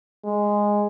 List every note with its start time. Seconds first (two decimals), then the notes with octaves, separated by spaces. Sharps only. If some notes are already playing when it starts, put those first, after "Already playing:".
0.24 G#3